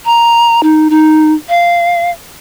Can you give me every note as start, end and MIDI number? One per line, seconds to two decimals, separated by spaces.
0.05 0.61 82
0.63 0.88 63
0.90 1.33 63
1.49 2.11 77